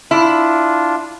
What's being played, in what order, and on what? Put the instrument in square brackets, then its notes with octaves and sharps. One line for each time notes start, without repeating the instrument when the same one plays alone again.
[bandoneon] D4 F4 [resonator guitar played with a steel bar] E4